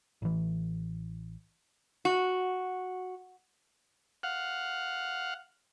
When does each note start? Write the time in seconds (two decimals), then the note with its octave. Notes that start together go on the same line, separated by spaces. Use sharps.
0.22 A1 E3
2.05 F#4
4.23 F5 F#5